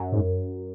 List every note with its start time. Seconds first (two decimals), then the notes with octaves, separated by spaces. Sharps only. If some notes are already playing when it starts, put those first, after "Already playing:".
Already playing: F#2
0.12 G#2